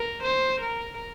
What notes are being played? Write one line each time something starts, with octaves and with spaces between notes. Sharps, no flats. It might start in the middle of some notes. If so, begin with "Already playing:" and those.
Already playing: A#4
C5
A#4